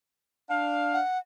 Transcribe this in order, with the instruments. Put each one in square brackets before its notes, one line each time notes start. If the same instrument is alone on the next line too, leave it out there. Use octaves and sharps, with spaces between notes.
[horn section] D4 F5
[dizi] F#5